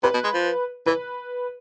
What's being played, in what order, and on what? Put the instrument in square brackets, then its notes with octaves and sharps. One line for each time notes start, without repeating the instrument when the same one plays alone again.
[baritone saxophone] C3 [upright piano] B4
[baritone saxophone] B2
G#3
F3
[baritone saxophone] E3 [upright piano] B4